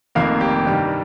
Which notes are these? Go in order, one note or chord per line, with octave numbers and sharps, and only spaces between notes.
F1 F2 D#3 A#3 F5
G4
G2 D#3 G3